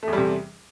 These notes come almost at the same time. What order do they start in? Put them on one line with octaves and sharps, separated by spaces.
A3 E2 G3 C3